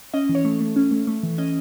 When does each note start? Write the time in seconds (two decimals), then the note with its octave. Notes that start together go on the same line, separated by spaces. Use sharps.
0.14 C#4 D#5
0.29 E3
0.35 C#5
0.45 A3
0.61 A3
0.76 C#4
0.91 A3
1.07 A3
1.23 E3
1.38 C#4 D#5